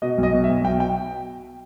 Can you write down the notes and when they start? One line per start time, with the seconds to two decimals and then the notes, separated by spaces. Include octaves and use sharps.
0.02 B2 D#5
0.18 B1
0.23 D#5
0.33 B2
0.44 E5
0.49 B1
0.64 B2 G5
0.80 G5